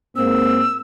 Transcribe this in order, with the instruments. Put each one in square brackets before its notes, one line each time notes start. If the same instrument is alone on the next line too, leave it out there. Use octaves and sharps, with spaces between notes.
[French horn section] G#2 A#3 C4 [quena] E6